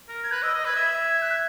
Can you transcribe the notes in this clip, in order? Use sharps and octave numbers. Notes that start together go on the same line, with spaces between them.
A#4
G#6
B4 F#6
D#5 E6
D#5
B4 G#6
E5
F#6
G#6